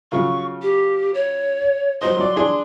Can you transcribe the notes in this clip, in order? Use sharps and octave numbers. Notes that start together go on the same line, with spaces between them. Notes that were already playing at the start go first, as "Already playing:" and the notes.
C#3 F#3 F4 C#6
G4
C#5
F#3 C5 D#5 C6
F#3 D5
D4 G#4